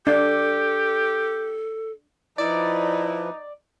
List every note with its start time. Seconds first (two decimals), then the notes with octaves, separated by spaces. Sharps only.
0.07 D4 G4 A4
2.38 F3 D#4 E4 B4 D5